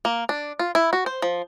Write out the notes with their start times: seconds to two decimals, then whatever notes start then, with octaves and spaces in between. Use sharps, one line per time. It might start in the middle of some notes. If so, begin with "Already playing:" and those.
0.05 A#3
0.29 D4
0.59 F4
0.75 E4
0.93 F#4
1.06 C5
1.22 F3